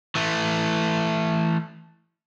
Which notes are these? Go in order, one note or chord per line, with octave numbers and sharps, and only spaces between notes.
E3 A3